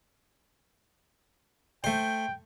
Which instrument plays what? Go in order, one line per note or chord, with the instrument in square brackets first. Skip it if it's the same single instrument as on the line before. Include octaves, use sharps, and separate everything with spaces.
[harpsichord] A3 C5 [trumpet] G5